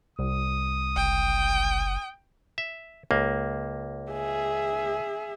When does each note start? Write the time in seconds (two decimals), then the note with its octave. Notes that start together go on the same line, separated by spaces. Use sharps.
0.19 C2 D#6
0.96 F#1 G5
2.58 E5
3.11 C#2 A#3
4.11 G#4 E5